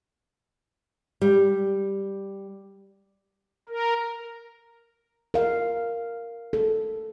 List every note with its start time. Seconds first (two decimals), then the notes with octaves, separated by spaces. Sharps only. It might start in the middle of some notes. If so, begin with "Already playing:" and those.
1.21 G3
3.69 A#4
5.34 A#4 F5
6.53 A4